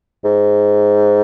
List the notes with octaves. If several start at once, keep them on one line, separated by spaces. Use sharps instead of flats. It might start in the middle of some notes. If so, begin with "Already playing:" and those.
G#2